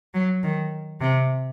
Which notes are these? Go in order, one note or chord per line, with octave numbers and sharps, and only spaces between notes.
F#3
D#3
C3